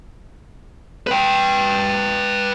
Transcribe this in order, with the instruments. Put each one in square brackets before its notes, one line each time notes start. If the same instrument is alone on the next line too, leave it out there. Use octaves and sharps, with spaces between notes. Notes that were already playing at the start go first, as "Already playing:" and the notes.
[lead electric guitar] B4 G5